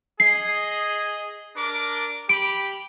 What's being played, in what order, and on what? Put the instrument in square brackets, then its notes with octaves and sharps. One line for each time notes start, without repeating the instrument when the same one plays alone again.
[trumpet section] G#4 D#5 [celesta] C7
[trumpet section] D4 A#4 D6
[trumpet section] G4 B5 [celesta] D7